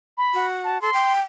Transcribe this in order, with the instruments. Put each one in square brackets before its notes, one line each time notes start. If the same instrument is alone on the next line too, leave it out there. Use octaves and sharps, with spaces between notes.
[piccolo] B5
[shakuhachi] F#4
[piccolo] A5
[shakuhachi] A4 [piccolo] C6
[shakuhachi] G5